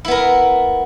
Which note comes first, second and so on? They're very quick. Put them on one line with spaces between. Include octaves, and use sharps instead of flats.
E4 B3 A#4